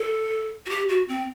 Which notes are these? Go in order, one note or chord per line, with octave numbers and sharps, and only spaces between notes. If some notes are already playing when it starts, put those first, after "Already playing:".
Already playing: A4
F#4
G4
F#4
C4